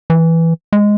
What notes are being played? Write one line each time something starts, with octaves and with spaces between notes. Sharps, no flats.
E3
G#3